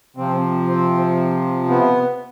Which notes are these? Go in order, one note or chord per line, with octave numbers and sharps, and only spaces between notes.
C3 F3 C4
C4
B3